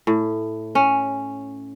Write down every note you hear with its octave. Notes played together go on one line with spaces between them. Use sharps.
A2
C#4